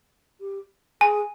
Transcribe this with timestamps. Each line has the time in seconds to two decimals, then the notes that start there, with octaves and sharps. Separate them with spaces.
0.40 G4
1.01 G#4 G#5